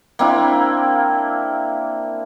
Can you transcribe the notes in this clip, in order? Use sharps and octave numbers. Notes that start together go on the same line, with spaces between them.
A#3 C4 D4 E4